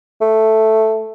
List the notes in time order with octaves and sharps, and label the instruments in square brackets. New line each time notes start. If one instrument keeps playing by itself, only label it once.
[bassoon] A3